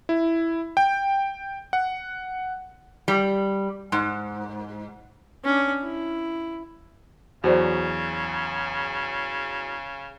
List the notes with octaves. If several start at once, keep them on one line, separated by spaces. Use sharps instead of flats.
E4
G5
F#5
G3
G#2
C#4 D4
E4
E2 C#3 F#3 F#4 C5 D5